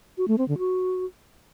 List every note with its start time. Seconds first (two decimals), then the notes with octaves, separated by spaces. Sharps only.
0.18 F#4
0.28 A3
0.38 C4
0.48 D3
0.58 F#4